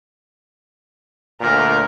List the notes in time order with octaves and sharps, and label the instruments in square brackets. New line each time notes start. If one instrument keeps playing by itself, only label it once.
[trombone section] D2 A#2 [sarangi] A#4